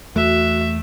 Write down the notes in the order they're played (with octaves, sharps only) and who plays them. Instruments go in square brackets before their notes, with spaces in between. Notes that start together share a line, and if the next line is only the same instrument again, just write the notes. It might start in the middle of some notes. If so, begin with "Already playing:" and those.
[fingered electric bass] E2 [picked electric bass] A3 [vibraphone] F#4 [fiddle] E5